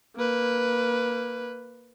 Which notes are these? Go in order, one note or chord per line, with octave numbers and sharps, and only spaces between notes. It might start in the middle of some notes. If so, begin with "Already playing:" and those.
A#3 B4